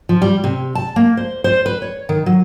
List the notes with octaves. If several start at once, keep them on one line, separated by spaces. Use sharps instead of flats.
F3
G3
C3
A5
A#3
C5
C5
B4
C#5
D#3
F#3